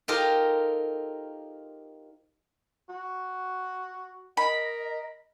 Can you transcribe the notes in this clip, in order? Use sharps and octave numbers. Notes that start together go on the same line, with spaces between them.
D#4 F4 G4 A4 A#4 C5
F#4
A#4 D#5 B5